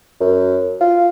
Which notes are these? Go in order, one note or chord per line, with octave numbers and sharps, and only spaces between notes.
F#2
F4